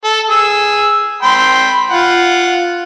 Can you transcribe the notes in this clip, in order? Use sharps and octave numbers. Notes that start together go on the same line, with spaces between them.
A4
G#4 E6
G5 B5 C6
F4 F#5